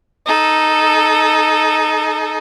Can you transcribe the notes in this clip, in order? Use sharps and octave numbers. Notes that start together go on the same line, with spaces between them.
D#4 A4